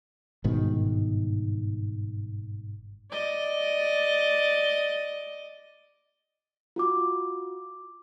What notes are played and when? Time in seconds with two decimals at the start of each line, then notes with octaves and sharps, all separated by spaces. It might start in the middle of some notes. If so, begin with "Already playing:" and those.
0.44 G1 G#2 B2 D#3
3.11 D5 D#5
6.76 F4 F#4 D6